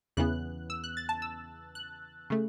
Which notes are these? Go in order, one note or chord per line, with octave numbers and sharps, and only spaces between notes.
E2 C#3 E3 B3 F#6
E6
F#6
A6
A5
E6
F#6
C#3 A3